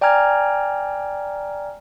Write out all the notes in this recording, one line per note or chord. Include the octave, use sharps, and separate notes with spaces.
D5 G5 G#5 A#5 F6 G#6